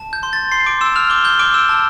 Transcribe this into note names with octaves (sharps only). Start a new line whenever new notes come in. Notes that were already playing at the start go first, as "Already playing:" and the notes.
Already playing: A5
G6
C6
A6
C6 C7
D6 D7
C6 E6 E7
F6 F7
D6 G6 G7
G6 G7
D6 F6 D7
E6 E7
A5